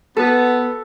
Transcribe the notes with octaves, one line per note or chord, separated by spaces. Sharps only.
B3 A4